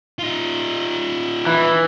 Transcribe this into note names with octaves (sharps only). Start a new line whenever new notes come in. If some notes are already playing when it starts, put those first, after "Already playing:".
D#4 F4
E3